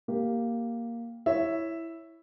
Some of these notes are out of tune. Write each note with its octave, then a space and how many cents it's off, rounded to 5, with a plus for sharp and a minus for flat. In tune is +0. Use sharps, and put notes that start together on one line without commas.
A#3 +0 G4 +0
E4 +0 C#5 +0 E5 +0